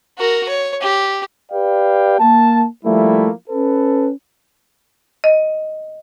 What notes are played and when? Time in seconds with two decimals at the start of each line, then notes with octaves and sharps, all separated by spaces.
0.18 F#4 A#4
0.49 C#5
0.82 G4
1.52 G4 B4 D5 F5 G5
2.20 A#3 A5
2.85 F3 G3 A3 A#3 E4
3.50 C#4 A4 B4
5.24 D#5